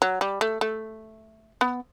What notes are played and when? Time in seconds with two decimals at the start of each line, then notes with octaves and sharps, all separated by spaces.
0.02 F#3
0.21 G3
0.41 A3
0.61 A3
1.61 B3